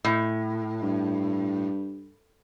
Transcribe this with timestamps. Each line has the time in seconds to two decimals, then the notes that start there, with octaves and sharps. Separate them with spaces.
0.05 A2
0.82 G2